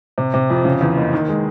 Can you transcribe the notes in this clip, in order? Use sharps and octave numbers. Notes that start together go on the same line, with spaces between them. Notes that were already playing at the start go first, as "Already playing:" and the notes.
C3
C3
F2
C#3
E2
F#1
D#3
G#3